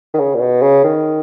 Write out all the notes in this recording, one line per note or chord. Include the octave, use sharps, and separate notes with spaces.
D#3
C#3
A#2
B2
C#3
D#3